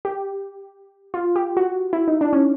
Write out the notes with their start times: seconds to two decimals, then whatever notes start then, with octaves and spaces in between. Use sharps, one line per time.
0.05 G4
1.14 F4
1.36 G4
1.57 F#4
1.93 E4
2.08 D#4
2.21 D4
2.33 C#4